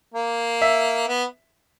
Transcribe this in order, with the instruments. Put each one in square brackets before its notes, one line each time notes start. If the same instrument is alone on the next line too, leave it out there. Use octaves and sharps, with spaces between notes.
[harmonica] A#3
[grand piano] E5
[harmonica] B3